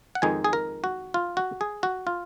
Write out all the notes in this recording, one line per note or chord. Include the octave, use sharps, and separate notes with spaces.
F#5
F2 D#3 G#3 D#4 G#5
G#4
A#4
F#4
F4
F#4
G#4
F#4
F4